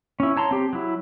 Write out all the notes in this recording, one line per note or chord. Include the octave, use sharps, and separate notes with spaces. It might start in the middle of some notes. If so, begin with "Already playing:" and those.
C#4 E4
C#5 A5 A#5 C6
C4 G4
F#3 E4